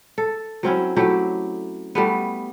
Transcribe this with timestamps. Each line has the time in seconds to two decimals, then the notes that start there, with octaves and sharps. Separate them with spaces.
0.18 A4
0.63 F#3 C4 C#4 E4
0.96 F#3 A3 E4 G4
1.95 G3 A3 B3